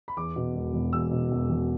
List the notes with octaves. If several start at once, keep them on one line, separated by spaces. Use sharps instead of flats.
B5
E2 D6
B2
E1
E1
E2 E6
B2
E1
E1